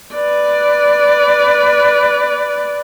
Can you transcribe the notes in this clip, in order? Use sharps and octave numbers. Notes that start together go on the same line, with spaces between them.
B4 D5